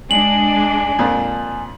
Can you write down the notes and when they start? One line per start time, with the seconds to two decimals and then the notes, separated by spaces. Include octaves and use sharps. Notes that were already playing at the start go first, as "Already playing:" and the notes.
0.11 G#3 D4 G#5 F#7
0.99 F2 A#2 F3